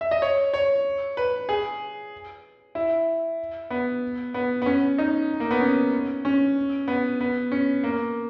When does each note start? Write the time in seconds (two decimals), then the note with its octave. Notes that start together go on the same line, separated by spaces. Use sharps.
0.01 E5
0.11 D#5
0.22 C#5
0.54 C#5
1.17 B4
1.49 G#4
2.75 E4
3.70 B3
4.34 B3
4.62 B3
4.66 C#4
4.98 D#4
5.40 A#3
5.51 B3
5.61 C#4
6.25 C#4
6.88 B3
7.20 B3
7.52 C#4
7.83 A#3